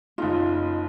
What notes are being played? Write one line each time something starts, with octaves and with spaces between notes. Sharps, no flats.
F#1 D#4 F4